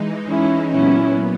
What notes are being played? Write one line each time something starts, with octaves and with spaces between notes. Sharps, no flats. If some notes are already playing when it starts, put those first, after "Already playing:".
Already playing: E3 G#3 D#4
C#4 E4
A#2 F#3 B3 C#4 E4